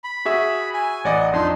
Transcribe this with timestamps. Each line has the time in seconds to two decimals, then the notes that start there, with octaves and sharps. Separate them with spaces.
0.04 B5
0.25 F#4 G#4 E5
0.74 G#5
1.04 A1 D5 D#5 F#5
1.33 F2 D4 D#4 D#5 C6